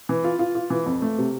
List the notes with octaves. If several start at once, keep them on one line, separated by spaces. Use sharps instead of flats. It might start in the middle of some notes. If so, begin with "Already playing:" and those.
E3
F4
F4
F4
E3
F2
A3
C3